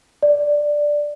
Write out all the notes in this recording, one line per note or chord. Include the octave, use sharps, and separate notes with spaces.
D5